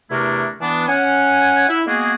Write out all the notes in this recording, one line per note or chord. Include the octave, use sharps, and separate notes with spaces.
E2 C3 A3 D4 E4 A#4
E3 B3 D4
C#4 F#5 G#5
E4
G#3 A#3 B3 F#4 G#4